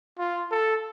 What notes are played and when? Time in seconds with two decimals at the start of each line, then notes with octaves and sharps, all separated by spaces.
0.19 F4
0.51 A4